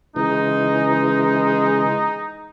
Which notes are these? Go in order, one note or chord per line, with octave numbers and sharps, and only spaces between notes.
C#3 E3 G#3 D#4